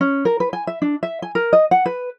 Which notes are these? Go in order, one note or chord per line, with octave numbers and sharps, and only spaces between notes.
C#4
A#4
B4
G#5
E5
D4
E5
G#5
A#4
D#5
F#5
B4